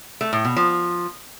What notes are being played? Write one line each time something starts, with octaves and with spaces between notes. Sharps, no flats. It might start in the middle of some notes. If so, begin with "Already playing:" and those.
A3
A2
B2
F3